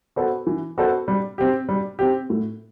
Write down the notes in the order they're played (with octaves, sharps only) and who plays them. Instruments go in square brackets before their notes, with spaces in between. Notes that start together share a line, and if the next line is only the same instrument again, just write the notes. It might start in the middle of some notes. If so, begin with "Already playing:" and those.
[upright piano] B3 F#4 A4 C5
E3
B3 F#4 A4 C5
G3
C4 G4
G3
C4 G4
A2